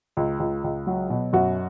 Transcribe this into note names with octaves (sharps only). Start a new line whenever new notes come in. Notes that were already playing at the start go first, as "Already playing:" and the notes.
C#2
C#2
C#2
F#3
B2
F#2 F#4